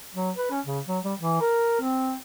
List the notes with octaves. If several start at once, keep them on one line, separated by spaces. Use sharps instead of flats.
F#3
B4
C#4
C#3
F#3
G3
E3
A#4
C4